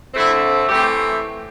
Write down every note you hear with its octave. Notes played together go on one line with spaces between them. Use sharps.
D3 A3 C4 E4
A2 E3 A3 C4 G4